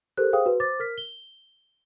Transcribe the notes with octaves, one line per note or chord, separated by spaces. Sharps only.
G4 A4 A#4 C5 F#6
G#4 C5 F5 G5 D#6
F#4 B4
C5 D6 A6
A#4 F6 B6
G7